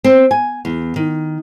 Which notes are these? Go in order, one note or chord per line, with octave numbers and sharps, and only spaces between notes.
C4
G#5
E2
D#3